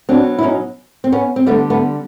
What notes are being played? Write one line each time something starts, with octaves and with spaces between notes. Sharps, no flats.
B2 F#3 C4 D4
E4
C#4 D#4
C4
B3 C#4
C4
D3 G3 A3 B3
A3 B3